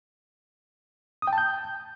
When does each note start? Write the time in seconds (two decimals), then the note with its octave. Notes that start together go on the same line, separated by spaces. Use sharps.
1.22 D#6
1.27 G5
1.33 A5
1.38 G6